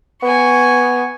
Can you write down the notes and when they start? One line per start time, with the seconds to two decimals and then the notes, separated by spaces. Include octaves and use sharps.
0.23 B3 G#5 C#6